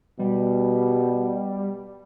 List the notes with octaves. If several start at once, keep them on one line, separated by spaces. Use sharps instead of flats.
B2 G3